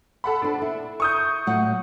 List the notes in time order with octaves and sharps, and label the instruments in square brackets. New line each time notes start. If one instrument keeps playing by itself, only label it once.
[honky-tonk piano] A4 F#5 B5
[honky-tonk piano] D4 [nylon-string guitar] A4 C5
[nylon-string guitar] E4
[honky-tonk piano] C#6 D#6 G6
[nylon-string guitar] A2 F#3 F#5